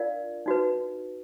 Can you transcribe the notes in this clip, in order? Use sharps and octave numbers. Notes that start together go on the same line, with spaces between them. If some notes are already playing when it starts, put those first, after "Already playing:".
Already playing: D4 F4 A#4 D5 F5
D#4 F#4 B4